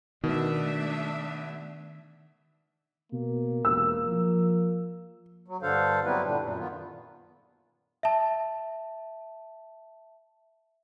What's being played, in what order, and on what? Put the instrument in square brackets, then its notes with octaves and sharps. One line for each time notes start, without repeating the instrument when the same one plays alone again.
[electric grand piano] B2 [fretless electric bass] D#3 [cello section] A3 D4 E5
[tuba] B2 [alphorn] A#3
[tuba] E1 [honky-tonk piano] E6
[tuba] F3
[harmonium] F#3
G2 D3 D4 A4 C5 F5
F#3 G3 B3 C4 E4 B4
A#2 D3 G3 D4
F#2 A#2
D#3 B3 F4
[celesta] E5 A5